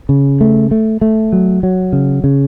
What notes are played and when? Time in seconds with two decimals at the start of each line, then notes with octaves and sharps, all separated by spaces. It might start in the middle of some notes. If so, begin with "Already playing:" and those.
0.09 C#3
0.41 A3
0.71 A3
1.01 A3
1.33 F#3
1.63 F#3
1.93 C#3
2.24 C#3